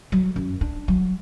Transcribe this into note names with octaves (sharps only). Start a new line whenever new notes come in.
F#3
F#2
D4
F#3